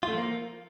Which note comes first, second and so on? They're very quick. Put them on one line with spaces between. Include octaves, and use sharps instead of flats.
F4 A3 F3 A#3